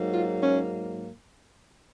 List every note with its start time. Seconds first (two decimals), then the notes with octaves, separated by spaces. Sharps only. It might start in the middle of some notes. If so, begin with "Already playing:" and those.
Already playing: G#2 F#3 A#3
0.14 F4
0.42 C#4